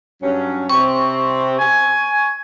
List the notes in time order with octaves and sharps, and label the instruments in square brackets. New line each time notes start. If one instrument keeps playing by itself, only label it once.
[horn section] G2 F#3 C#4
[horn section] C3 C4 [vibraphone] C#6
[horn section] G#5